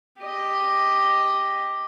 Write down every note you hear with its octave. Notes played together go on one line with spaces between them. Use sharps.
G4 D#5